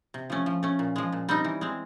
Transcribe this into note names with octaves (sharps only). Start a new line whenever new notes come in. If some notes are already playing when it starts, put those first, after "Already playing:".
C3
F3 A3 C#4
F3
A3 C#4
A#2
F3 G#3
A#2
G3 C4 D#4
E3
G#3 C4